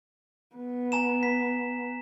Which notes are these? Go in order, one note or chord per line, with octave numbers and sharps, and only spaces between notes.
B3
G#5 A#5 E7
B6